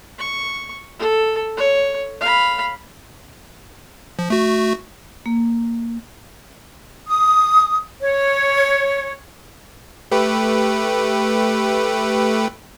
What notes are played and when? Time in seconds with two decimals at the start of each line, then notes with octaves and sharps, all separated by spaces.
0.18 C#6
0.99 A4
1.57 C#5
2.21 F5 B5
4.19 F3
4.30 A3 F#4
5.26 A#3
7.07 D#6
8.01 C#5
10.11 A3 G4 B4